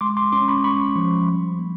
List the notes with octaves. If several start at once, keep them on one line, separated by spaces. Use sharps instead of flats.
G#3 C6 D6
C6 D6
C#4 C6 D6
B5 C#6
G#3 B5 C#6
F3
G3
A#3